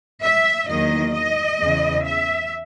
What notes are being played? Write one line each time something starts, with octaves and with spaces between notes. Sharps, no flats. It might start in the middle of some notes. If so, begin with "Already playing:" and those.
E5
E2 D#3 F#3 A#3 D#5
D#5
E2 C#3 E3
E5